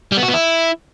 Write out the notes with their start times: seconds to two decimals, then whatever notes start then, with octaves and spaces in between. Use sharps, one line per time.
0.12 G3
0.17 B3
0.23 F#4
0.28 B3
0.34 E4